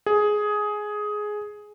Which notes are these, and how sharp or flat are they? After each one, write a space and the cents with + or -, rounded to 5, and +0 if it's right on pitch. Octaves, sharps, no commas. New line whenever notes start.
G#4 +10